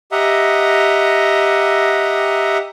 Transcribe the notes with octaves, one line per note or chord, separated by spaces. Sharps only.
G4 D#5 E5 F#5 A#5